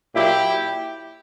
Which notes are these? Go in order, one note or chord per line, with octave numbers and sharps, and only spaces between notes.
A#2 F#3 E4 G4